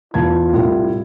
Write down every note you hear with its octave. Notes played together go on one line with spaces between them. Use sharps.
E2 F4 A5 G#6
C2 A2